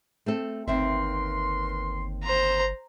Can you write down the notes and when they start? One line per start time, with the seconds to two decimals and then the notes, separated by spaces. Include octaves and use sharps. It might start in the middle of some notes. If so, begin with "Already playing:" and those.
0.26 A3 C4 A4
0.68 G1 D#2 C4 A#4 B4 E5 C6
2.24 C5 A#5